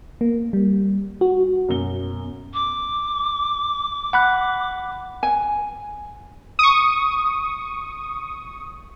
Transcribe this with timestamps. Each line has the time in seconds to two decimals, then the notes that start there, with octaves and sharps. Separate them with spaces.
0.21 A#3
0.53 G3
1.21 F#4
1.68 F#2 B2 G7
2.54 D6
4.13 F#5 B5 F#6
5.23 G#5
6.59 C#6 D#6